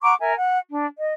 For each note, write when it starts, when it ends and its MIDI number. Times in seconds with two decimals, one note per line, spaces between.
0.03 0.14 78
0.03 0.14 82
0.03 0.14 85
0.03 0.14 86
0.19 0.34 70
0.19 0.34 76
0.19 0.34 80
0.36 0.58 78
0.69 0.86 62
0.96 1.13 75